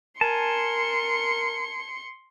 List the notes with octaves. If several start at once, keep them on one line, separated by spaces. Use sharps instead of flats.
A#4 G#5 A5 C6 C#7